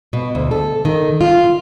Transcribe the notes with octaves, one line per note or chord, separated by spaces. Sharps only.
B2
D2
A4
D#3
F4